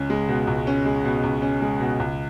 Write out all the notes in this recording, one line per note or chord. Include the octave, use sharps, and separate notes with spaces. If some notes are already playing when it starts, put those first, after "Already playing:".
Already playing: C#2 C#4
G#3
B2
C#2
C#4
G#3
B2
C#2
C#4
G#3
B2
C#2